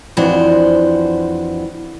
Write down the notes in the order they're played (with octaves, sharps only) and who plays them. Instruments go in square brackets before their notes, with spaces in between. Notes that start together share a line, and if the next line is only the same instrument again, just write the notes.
[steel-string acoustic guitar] F2 E3 D4 F#4 C5